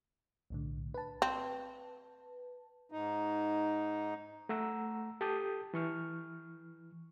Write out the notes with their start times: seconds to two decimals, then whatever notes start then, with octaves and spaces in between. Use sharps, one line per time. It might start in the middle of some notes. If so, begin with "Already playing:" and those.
0.50 B1 A2 D3
0.94 B4 A5
1.22 C4
2.92 G#2 D#4
4.49 A3 F#5 A#5 E6
5.21 G4 A4 A5 D#6 G6
5.74 E3 C#6 F6